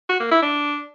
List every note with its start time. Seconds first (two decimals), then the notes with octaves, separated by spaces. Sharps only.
0.09 F#4
0.20 A#3
0.31 E4
0.42 D4